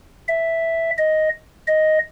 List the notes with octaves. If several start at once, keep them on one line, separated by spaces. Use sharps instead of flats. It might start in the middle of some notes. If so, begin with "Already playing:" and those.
E5
D#5
D#5